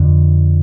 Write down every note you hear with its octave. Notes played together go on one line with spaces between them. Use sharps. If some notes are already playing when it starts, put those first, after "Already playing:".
Already playing: F2 D3